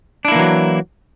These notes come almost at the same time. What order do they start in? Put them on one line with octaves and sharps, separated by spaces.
D4 E4 A#3 E3 F#3